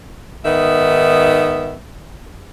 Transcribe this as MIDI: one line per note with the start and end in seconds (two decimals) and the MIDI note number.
0.44 1.75 44
0.44 1.75 51
0.44 1.75 59
0.44 1.75 76